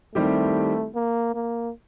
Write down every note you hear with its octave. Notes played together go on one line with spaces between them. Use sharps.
D#3 G3 A3 C4 E4 G4
A#3
A#3